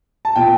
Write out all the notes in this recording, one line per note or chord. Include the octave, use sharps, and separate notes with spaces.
A5
A#2 G5